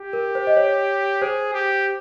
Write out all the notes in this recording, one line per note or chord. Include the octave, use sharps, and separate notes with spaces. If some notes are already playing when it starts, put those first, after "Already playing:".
Already playing: G4
A#4
C5
D#5
C#5
G#4 C5
G4